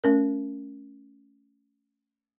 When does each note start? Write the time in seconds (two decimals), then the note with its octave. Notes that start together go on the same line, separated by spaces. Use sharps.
0.04 A3 C#4 A#4